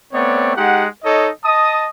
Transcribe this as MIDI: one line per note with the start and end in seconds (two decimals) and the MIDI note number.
0.13 0.54 57
0.13 0.54 59
0.13 0.54 60
0.13 0.54 73
0.13 0.54 74
0.56 0.86 56
0.56 0.86 63
0.56 0.86 67
0.56 0.86 78
1.04 1.29 63
1.04 1.29 69
1.04 1.29 73
1.04 1.29 75
1.44 1.86 75
1.44 1.86 81
1.44 1.86 87